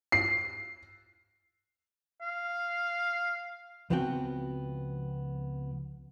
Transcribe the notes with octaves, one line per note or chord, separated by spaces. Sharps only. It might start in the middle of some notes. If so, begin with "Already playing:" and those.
C7
F5
C#2 F3 B3 C4 F#4 G5